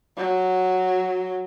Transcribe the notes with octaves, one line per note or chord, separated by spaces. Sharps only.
F#3